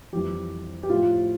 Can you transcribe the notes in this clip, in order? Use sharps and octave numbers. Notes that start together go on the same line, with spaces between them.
F2 E3 G3 G4
G4
A2 F3 F4